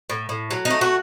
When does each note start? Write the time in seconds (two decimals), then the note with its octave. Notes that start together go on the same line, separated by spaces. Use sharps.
0.10 A2
0.29 A2
0.51 F#3
0.65 D#4
0.70 A3
0.81 F#4